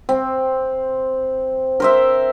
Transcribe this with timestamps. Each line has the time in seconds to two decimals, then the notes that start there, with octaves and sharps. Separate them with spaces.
0.09 C4
1.80 A#4 C5 E5